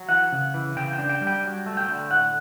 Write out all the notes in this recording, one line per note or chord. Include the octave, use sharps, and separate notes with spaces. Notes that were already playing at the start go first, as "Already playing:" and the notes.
Already playing: F#3
E3 F#5
C#3
E3
C#3 G5
G5
D4
G5
G3
G5
F#3
A3
G5
D3
A2 F#5